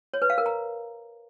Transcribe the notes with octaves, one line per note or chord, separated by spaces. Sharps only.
C#5
B4
F5
A#4
A#5